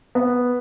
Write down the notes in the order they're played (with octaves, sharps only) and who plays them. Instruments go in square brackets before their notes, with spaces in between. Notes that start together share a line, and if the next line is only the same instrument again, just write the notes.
[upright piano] B3